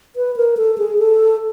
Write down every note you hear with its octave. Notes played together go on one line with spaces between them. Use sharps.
B4
A#4
A4
G#4
A4